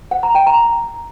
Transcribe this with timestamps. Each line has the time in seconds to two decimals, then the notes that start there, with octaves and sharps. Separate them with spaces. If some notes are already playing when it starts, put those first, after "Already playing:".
0.11 F#5
0.23 A#5
0.35 G5
0.47 A#5